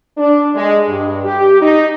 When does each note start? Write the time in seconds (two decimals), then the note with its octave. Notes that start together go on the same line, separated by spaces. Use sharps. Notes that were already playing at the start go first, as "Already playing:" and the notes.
0.18 D4
0.55 G#3
0.88 G2
1.25 G4
1.61 D#4